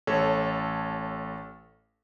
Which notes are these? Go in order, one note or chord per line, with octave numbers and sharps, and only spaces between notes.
A1 A4 C#5